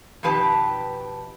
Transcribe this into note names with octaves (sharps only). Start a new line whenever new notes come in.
F2 B2 D#3 G4 B4 A5